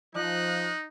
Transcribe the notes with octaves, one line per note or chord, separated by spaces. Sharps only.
F3 D#4 D#5 F#6